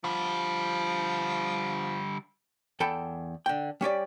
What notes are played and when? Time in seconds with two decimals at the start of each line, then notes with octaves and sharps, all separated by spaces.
0.04 D3 F3 G3
2.80 E2 A4 G5 A5 B5
3.46 D3 G5
3.81 G3 C#4 G4 D5